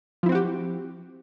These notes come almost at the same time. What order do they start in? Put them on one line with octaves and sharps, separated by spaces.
F3 E4 C4 F#4 G4